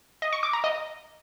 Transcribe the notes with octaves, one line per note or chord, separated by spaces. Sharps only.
D#5
C#6
D6
A#5
D#5